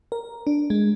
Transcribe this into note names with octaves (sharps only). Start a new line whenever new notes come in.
A#4
D4
G#3